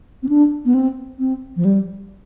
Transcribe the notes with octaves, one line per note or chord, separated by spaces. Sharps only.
C4
D4
B3
C4
C4
F3
G3